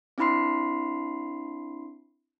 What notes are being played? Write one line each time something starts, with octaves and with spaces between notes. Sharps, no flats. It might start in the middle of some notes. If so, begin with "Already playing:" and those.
C4 D4 E4 B5 C6 C7